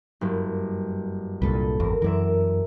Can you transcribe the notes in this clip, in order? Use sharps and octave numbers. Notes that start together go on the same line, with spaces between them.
F#1 G2
C2 G2 A#2 A4 B4
G#1 E2 C4 A#4
F#2 E3 A#4 D5 E5